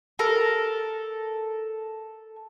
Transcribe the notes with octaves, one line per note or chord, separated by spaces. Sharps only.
A4 A#4